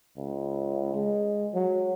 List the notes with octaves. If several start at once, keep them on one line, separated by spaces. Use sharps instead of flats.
C#2
G#3
F#3